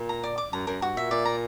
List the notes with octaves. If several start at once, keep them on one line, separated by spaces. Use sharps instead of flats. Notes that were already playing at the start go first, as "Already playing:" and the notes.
Already playing: A#2
A#5
D5
D6
F#2 A#5
F#2 A#4
G2 F#4
A#2 E5
A#2 D5
A#5